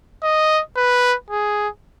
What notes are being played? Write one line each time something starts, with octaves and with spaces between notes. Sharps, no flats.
D#5
B4
G#4